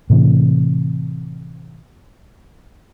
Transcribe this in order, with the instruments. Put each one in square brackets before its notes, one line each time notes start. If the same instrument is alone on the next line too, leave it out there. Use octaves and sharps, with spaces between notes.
[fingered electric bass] A2 C3 E3